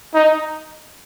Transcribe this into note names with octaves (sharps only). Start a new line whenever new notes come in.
D#4